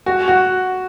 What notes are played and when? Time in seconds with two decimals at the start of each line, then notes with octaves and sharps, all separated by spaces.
0.06 F#4
0.28 F#4